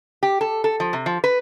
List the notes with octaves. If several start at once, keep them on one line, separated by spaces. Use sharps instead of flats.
G4
A4
A4
F3
C3
F3
B4